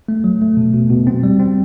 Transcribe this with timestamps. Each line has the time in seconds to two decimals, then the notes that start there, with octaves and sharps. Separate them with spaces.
0.08 A3
0.24 F#3
0.41 A3
0.57 B2
0.74 B2
0.90 B2
1.07 C4
1.23 G3
1.39 C4